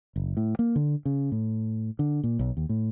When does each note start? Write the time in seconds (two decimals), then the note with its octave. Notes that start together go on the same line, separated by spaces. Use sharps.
0.16 F#1
0.37 A2
0.59 A#3
0.76 D3
1.05 C#3
1.32 A2
1.99 D3
2.24 A#2
2.39 B1
2.57 D#2
2.69 A2